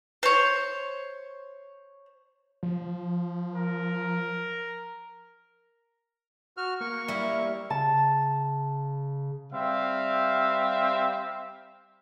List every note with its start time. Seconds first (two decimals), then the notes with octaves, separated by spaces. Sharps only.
0.23 C5 C#5
2.63 F3
3.55 A#4
6.57 F#4 F6
6.80 A#3 C#6
7.08 G3 E4
7.70 C#3 A5
9.53 G3 C4 E5 F5